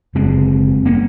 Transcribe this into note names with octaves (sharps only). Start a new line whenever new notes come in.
F#1 F#2 C#3 G#3 C4
A#3 C#4